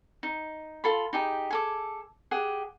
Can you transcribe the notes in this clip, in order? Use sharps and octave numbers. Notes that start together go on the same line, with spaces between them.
D#4
F4 A4 B5
D#4 G4 G#4
G#4 A4 D6
G4 G#4 F#5